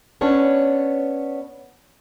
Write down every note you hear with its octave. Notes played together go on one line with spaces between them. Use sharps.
B3 C#4 D4 C#5